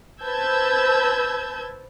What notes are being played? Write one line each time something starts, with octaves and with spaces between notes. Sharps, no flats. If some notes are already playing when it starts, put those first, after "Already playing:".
B4 C5 A5 E6 G6 G#6